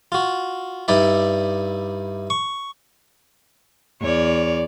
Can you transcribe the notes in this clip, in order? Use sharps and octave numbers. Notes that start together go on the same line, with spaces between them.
F4 F#4
G2 D#4 E4 D5 E5
C#6
E2 C#5 D5